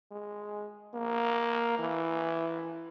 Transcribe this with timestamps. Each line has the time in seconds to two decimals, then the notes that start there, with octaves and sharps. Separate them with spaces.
0.11 G#3
0.94 A#3
1.79 E3